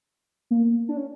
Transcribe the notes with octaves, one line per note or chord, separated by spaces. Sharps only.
A#3
D4
C#4